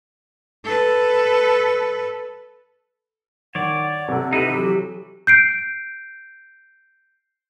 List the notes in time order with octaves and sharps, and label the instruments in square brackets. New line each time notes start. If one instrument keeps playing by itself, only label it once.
[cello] A4 B4
[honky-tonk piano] D#3 [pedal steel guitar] C#5 D5 [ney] F#5
[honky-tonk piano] C3 A4
[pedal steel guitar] D#4 E4 B4 [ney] G4
[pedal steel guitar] E3 F#3
[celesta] G6 C7 D7